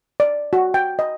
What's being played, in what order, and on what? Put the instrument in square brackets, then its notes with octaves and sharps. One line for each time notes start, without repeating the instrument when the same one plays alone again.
[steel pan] D5
F#4
G5
D#5